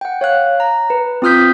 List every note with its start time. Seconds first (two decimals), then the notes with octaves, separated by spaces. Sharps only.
0.01 F#5 G5
0.21 C#5 F5 F#6
0.60 A#5
0.90 B4
1.22 C4 F4 D#6 F6 G6 B6